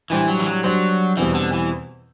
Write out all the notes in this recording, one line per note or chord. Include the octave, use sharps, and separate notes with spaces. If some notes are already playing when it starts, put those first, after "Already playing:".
A2 E3 G3 D4 G4 C5
F#3
E3
F#3
F#3 G3 D4 F#4 C5
E2 B2 E3 G3 C4
D3
E3